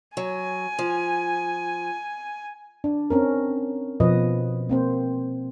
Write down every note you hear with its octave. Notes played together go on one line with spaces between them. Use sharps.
F#3 G#5
F3
D4
C4 C#4 A#4
B2 F3 B4 D#5
A#3 C4 C5